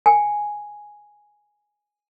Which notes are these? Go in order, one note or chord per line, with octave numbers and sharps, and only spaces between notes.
G5 G#5